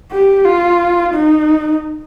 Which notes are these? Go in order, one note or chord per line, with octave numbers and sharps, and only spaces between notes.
G4
F4
D#4